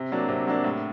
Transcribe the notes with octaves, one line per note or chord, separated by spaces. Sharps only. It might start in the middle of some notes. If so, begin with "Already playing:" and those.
Already playing: C3
F#3 A#3 D4
C3
F#3 A#3 D4
A2